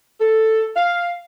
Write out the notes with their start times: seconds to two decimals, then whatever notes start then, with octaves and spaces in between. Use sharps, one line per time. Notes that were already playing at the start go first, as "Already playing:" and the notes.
0.21 A4
0.76 F5